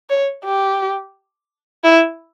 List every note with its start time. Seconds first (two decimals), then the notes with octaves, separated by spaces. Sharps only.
0.10 C#5
0.45 G4
1.84 E4